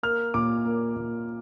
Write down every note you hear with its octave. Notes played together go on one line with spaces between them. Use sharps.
A#3 F6
A#2 D6
A#3
A#2